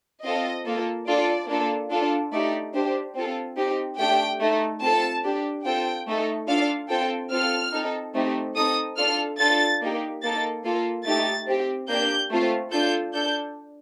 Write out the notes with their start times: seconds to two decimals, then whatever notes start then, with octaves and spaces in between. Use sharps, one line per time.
0.24 C4 F4 A4 D#5
0.65 A#3 F4 A4
1.07 D4 F4 A4 D5
1.49 A#3 D4 F4 A4
1.91 D4 F4 A4
2.32 A3 D#4 G4 D5
2.74 D4 G4 C5
3.15 C4 F4 A4
3.57 C4 D#4 G4
3.98 A3 D4 G4 G5
4.40 A3 D#4 A4
4.81 C4 F4 A4 A5
5.24 D4 G4
5.65 C4 F4 A4 G5
6.07 A3 D#4 A4
6.48 D4 F4 A4 F5
6.89 C4 F4 A4 G5
7.31 C4 F4 A4 F6
7.73 C4 D#4 A4
8.15 A3 C4 D#4 G4
8.56 C4 D#4 A4 D#6
8.97 D4 F4 A4 F6
9.40 D4 F4 A4 A6
9.81 A#3 D#4 G4
10.22 A#3 D#4 A4 A6
10.64 A#3 F4 A4
11.06 A3 D#4 G4 A6
11.47 C4 G4
11.88 A#3 D4 G4 G6
12.30 A3 C4 F4
12.72 D4 F4 A4 G6
13.14 D4 A4 G6